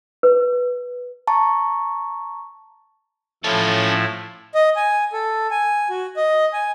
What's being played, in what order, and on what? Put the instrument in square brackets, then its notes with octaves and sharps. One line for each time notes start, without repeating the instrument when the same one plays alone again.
[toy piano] B4
[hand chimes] A5 A#5 C#6
[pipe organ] A2 F3 E4 [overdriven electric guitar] C#4 A4
[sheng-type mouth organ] D#5
G#5
A4
G#5
F#4
D#5
G#5